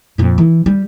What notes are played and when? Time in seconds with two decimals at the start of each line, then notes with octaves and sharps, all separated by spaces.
0.18 F2 A#2
0.38 E3
0.66 G3